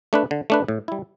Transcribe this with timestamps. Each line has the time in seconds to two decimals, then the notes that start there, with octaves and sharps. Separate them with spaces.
0.13 A3 D4 B4
0.31 D3
0.50 A3 D4 B4
0.68 A2
0.88 G3 E4